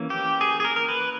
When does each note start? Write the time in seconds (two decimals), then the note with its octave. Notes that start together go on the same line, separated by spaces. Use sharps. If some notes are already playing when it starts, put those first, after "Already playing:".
Already playing: E3 A#3 C#4
0.10 G4
0.41 G#4
0.60 G#4
0.65 A#4
0.76 A#4
0.89 B4